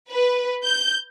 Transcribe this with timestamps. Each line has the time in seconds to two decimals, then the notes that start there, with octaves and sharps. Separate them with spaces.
0.10 B4
0.64 G6